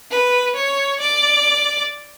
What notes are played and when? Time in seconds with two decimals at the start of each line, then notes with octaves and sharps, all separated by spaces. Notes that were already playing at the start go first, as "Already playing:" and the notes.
0.11 B4
0.56 C#5
1.00 D5